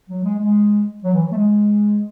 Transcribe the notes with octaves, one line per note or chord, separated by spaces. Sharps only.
F#3
G#3
G#3
F#3
E3
F#3
A3
G#3